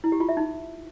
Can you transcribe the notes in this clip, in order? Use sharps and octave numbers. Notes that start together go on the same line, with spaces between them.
E4
G4
F4
E5
D#4